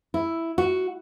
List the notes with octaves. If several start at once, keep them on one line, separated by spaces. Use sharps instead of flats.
E4
F#4